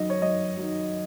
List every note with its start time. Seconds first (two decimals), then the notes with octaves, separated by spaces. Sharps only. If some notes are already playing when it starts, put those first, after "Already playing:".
Already playing: F#2 D#3 F#3 D#5
0.10 C#5
0.22 F#2 D#5
0.57 D#3 F#3